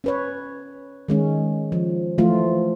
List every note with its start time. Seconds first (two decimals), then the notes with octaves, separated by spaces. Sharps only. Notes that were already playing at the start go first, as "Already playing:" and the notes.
0.04 C#4 B4 C#5
1.08 D#3 G#3 C#4
1.72 F3
2.18 E3 F3 A3 F4